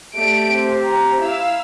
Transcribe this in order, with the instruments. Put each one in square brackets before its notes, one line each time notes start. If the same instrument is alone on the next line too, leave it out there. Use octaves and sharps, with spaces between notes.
[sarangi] A3 [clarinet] G4 [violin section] D5 D7
[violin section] C4
[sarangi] A#5
[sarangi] E4 [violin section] F5 E6